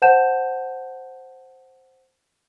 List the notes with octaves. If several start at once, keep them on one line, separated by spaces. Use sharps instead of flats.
C5 F#5 A5 G6 E7